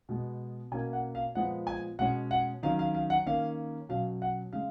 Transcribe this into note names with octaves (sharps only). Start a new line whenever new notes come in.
B2 G#3 B3
B2 A#3 C#4 G#5
F#5
F5
A#2 F3 G#3 B3 F#5
G#5
B2 G#3 C#4 F#5
F#5
D#3 F#3 C#4 F5
F5
F5
F#5
D#3 A#3 C#4 F5
B2 F#3 C#4 F5
F#5
C#3 G#3 F5